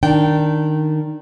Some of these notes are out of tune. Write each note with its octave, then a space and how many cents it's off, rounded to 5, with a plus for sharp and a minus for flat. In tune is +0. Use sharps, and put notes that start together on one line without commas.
D#3 -10 D4 +0 G5 -15